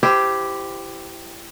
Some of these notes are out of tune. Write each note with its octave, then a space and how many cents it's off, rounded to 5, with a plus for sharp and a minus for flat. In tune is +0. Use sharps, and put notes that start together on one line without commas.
E4 +25 G4 +0 C5 -20